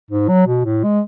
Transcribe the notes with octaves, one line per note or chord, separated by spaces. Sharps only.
G#2
F#3
B2
A2
G#3